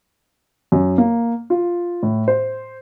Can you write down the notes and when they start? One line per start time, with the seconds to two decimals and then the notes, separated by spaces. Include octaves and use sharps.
0.72 F#2
0.98 A#3
1.50 F4
2.03 A2
2.28 C5